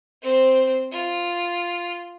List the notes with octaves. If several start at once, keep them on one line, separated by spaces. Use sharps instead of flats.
C4 C5
F4